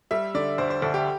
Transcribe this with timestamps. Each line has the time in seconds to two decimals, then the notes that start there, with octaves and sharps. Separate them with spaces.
0.11 G3 E5
0.34 D3 D5
0.58 D2 C5
0.70 C5
0.82 D2 A4
0.94 G4